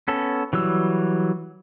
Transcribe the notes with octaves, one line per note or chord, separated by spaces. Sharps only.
B3 C#4 A4
E3 F#3 G3 E6